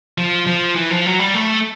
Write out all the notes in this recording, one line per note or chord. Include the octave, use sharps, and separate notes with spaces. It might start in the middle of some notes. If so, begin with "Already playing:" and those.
F3
F3
E3
F3
F#3
G3
A3